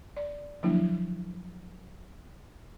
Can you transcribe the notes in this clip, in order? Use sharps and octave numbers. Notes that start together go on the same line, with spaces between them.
D5
D3 F3 F#3 A#3 D4 E4